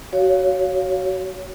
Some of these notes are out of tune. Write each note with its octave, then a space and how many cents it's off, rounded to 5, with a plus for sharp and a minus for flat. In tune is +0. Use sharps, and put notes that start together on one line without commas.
F#4 +20 C#5 +10 F5 +0